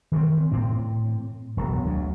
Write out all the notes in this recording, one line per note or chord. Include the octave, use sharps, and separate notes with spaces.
D#3 E3 C4
A2 C4
E1 B1
D2 F#3